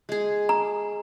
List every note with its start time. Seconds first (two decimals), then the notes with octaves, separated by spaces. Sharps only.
0.09 G#3 G#4
0.49 A#5